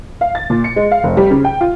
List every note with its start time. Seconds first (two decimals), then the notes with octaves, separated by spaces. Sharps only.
0.21 F5
0.35 A6
0.50 A#2
0.64 C#7
0.76 G#3
0.91 F5
1.03 F1
1.17 G3
1.31 C#3
1.45 G5
1.61 F4